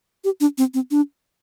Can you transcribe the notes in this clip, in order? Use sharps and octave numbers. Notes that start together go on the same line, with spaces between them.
G4
D4
C4
C4
D4